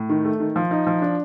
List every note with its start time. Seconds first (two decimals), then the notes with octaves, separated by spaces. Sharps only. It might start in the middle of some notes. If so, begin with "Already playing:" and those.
Already playing: A2
0.09 D#3
0.25 A3
0.40 D#3
0.56 F3
0.71 D#4
0.87 F3
1.02 D4